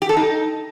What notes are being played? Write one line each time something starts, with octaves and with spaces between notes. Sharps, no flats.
G4
A4
D#4